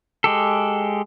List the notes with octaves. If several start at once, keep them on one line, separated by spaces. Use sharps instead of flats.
G#3 G4 A4